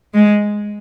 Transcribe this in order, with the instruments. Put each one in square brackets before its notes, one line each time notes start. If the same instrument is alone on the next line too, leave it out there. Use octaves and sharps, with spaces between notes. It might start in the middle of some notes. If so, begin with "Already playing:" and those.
[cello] G#3